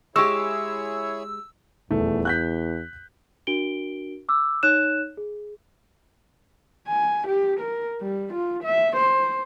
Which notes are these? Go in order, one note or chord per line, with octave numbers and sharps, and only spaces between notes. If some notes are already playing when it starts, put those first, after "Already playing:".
G#3 E4 G4 G#4 C#5 C#6 E6
D#1 E2 A3
F#6 G6 B6
D4 F#4 A#4 D7 G7
D6 E6
D#4 C#5 F#6 E7
G#4
G#5
G4
A#4
G3
F4
E5
C5